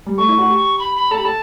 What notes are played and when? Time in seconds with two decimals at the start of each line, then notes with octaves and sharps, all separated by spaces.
0.06 G3
0.18 A3 C#6
0.29 E4
0.38 F#4
0.49 G4
0.79 B5
0.95 B5
1.11 A4 A5
1.17 G4 B5
1.25 A4 A5